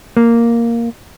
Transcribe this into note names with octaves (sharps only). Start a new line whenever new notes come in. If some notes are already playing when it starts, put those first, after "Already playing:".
A#3